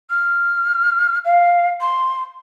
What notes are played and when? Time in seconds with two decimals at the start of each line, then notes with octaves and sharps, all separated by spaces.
0.09 F6
1.24 F5
1.80 C6